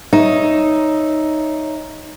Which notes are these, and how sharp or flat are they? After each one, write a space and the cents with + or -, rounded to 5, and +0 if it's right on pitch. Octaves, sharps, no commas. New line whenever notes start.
D#4 +0 C#5 +0 E5 -5